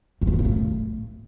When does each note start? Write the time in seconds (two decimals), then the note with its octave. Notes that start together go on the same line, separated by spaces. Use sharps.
0.21 F2
0.27 D#3
0.33 D3
0.39 C#3
0.45 A2